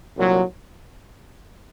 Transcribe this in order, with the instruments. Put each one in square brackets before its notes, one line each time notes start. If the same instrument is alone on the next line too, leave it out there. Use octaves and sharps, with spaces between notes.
[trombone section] C2 A#2 F#3